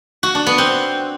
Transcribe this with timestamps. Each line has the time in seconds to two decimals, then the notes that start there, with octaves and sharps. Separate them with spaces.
0.23 F#4
0.35 D4
0.46 B3
0.58 C4